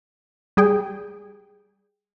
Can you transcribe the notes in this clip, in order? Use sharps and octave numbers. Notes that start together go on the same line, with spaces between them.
G3 G#4 G5